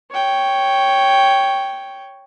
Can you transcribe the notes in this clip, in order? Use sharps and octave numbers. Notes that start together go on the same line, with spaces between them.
C#5 G5